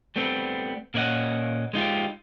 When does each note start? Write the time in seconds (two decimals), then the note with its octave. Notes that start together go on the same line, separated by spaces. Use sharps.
0.16 G3 A3 B3 C4
0.94 A#2 A#3 C#4 D5 D#5 F#5
1.73 G#3 D#4 F4 G4